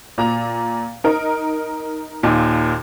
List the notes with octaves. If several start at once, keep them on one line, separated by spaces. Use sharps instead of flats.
A#2 A#5 F7
D#4 A#4
D#2 A#2